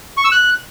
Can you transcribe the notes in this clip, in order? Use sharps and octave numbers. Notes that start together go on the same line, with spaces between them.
C#6
E6
F#6